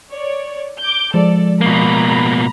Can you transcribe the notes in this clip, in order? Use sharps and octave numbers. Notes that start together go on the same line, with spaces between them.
C#5 D5
D6 G6
F3 G#3 A4 D5
B2 A#3 A#5 B5 A#6